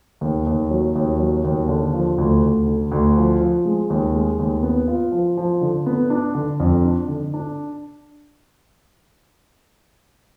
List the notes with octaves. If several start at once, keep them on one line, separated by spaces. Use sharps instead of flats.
D#2
D#2
F#3
D#2
F#3
D#2
D3
F3
D2
D2
D3
D2
F3
F3
G#3
D#2
G#3
D#2
B3
F4
F3
F3
D3
B3
D4
D3
F2
D4
D3
D4